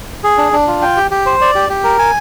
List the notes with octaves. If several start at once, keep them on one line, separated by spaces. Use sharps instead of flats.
G#4
D4
D4
F4
G5
G4
G4
C5
D5
G4
G4
A#4
G#5